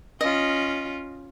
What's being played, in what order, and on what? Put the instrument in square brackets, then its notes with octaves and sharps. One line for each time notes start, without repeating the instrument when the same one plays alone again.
[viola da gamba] C#4 F4 [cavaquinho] D#5